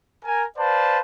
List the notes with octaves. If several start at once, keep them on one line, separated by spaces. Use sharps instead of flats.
A#4 G#5
B4 C5 D5 F5 A5